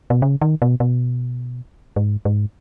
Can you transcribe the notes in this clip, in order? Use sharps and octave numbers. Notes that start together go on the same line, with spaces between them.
B2
C#3
D#3
B2
B2
G#2
G#2